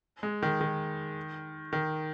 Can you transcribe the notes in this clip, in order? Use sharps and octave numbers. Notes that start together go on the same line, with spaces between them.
G#3
D#3
D#3
D#3